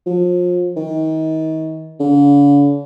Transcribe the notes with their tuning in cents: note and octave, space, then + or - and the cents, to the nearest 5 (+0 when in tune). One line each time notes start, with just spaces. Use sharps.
F3 +30
D#3 +35
D3 -45